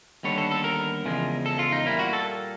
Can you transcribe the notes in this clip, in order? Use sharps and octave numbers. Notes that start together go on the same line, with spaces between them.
D#2 D3 G3 B3 D4 C#5
A4
A4
A#4
E2 C#3 F3 G#3
A4
F4
D#4
A#2 G3 A#3 E4
F#4
A4